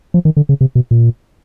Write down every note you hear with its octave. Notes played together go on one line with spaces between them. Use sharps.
F3
D#3
D3
C#3
C3
B2
A#2